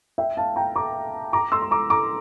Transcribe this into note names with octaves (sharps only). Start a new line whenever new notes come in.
E5 G5
F5 A5
G5 A#5
A#5 D6
A#5 D6
C6 E6
C6
A#5 D6
A#5 D6